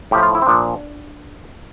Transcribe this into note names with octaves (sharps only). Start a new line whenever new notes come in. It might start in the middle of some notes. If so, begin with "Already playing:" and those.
A2 F3 G4
F4
E4
C4
A#2 F3 D4